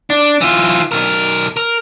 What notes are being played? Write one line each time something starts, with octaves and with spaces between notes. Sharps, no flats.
D4
E3 F4
B1 A#4
A#4